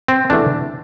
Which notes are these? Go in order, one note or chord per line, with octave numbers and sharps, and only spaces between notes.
C4
E2 C3 E3 A3 D4